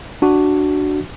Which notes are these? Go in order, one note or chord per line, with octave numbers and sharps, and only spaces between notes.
D4 F#4